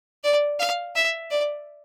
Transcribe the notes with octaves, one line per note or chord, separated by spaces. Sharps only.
D5
F5
E5
D5